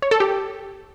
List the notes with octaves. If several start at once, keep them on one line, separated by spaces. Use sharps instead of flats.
C#5
A4
G4